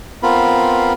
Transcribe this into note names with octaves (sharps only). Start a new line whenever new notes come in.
B3 C4 F4 A#4 B5